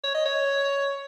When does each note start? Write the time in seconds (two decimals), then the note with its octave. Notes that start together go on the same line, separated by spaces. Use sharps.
0.04 C#5
0.14 D#5
0.26 C#5